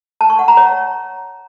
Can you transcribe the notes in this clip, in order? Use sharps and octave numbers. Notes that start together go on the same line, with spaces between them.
A5
C#6
F#5
A#5
C#5